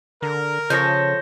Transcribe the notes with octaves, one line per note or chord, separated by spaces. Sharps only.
D3 A#4
C#3 F3 A4 C#5 G6 A#6